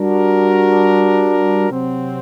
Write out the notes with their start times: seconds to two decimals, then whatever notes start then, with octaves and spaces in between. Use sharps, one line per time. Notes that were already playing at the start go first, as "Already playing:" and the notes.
Already playing: G3 D4 F#4 A#4
1.70 C3 F#3 C4